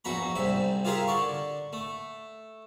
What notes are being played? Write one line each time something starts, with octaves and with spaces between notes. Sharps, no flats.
A#1 E2 F#4 A#5 B5
C2 G#2 C3 E5
F4 G4 G#4 A#4 E5 F5
D3 D5 C#6
A3